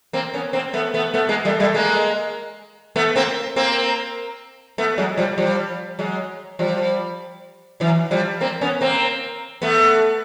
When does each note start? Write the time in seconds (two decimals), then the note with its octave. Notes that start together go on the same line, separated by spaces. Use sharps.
0.13 A#3 C4
0.34 B3 C#4
0.53 A#3 C4
0.73 A3 B3
0.94 A3 B3
1.14 A3 B3
1.29 G#3 A#3
1.45 G3 A3
1.60 G3 A3
1.74 G#3 A#3
2.96 A3 B3
3.16 A#3 C4
3.56 A#3 C4
4.78 A3 B3
4.98 F#3 G#3
5.17 F3 G3
5.38 F3 G3
5.99 F#3 G#3
6.59 F3 G3
7.80 E3 F#3
8.11 F3 G3
8.41 A#3 C4
8.61 B3 C#4
8.81 A#3 C4
9.62 A3 B3